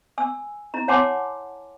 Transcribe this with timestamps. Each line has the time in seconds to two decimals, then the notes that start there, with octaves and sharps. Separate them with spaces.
0.18 G#5 E6
0.74 E4 A#5
0.88 C#5 F#5 G#5 A5 C6 D6